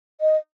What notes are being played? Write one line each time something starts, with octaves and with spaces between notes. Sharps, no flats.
D#5